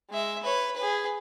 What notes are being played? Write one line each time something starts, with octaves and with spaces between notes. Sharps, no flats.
G#3 E5
B4 C#5
G#4 B4